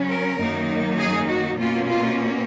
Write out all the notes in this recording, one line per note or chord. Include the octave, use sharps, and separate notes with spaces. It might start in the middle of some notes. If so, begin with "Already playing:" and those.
Already playing: C#3 F#3 C#4
A#4
F#2 D#3 A#3 D#4
G#4
F#4
B2 A#3 C#4 F4
F4